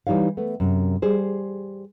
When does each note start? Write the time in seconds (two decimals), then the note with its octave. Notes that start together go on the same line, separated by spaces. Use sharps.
0.07 E3 G3 D#4 C#5 F5
0.37 A3 B3
0.60 F#2 C3
1.02 G3 G#4 C5